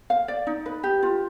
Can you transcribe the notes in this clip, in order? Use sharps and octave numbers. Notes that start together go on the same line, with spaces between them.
F5
D5
D#4
B4
G4
F4